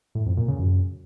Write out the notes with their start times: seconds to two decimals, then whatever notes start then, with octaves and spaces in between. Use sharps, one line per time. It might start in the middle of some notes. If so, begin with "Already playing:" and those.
0.15 A2
0.26 F2
0.37 A#2
0.48 C#3
0.59 F#2